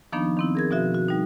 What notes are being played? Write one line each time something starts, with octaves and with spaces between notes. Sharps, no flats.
D#3 F3 A#3 B3 D4 D#4
D#3 C4 E4
G#4 A#4 G#6
B2 F3 F#4 E5
F#4
G3 D#4